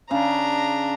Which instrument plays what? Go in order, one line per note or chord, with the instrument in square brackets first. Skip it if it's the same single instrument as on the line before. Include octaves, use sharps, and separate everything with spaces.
[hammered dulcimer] C#3 [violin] D4 A#5